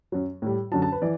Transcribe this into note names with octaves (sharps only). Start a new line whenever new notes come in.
F#2 F#3
A2 G3
F#2 D3 F#3 A5
A5
B4
E3 D5